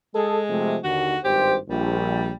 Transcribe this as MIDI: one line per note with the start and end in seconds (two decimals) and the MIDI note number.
0.15 0.76 56
0.15 0.40 68
0.15 0.40 69
0.49 0.77 48
0.49 0.77 53
0.49 0.77 57
0.84 1.15 39
0.84 1.15 50
0.84 1.18 66
1.24 1.57 32
1.24 1.57 43
1.24 1.54 67
1.24 1.57 72
1.69 2.30 34
1.69 2.35 55